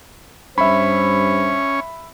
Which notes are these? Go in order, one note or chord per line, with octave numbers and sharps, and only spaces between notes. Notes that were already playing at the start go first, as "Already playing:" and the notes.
G2 C#4 C5 E5 B5